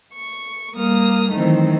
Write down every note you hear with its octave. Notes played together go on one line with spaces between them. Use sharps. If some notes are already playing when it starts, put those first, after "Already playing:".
C#6
G3 A#3 D#6 F6
D#3 E3 F#3 A3 C4 D#4